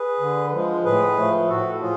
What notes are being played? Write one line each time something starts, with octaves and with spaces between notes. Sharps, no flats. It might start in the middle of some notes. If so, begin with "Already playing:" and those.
Already playing: G#4 B4
D3
F3 G#3
A2 G#4 B4
F3 A3
A2 F#4 A4
F3 F4 G#4